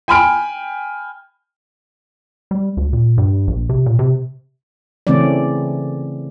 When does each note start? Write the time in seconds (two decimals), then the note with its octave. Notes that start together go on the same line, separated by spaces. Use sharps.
0.08 G5 G#5 B5 F6 D7
2.51 G3
2.77 D2
2.93 A#2
3.18 G2
3.47 A#1
3.69 C3
3.86 A#2
3.99 C3
5.07 C#3 E3 A3 C4 C#4 D5